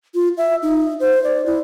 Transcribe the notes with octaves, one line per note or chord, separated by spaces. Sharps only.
F4
E5
D#4
C5
D5
E4